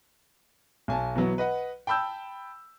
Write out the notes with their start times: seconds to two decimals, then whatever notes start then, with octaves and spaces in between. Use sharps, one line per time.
0.88 B1 G#5 A5
1.15 B2 E3 F#3 B3
1.38 B4 D#5 F#5
1.87 G5 A5 B5 E6 G6